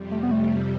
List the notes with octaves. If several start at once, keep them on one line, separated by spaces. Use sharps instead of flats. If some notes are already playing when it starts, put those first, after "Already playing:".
Already playing: F2 C3 G3
A3
B3
A3